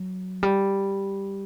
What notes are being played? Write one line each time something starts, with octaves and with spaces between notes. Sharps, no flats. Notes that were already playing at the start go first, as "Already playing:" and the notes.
Already playing: F#3
G3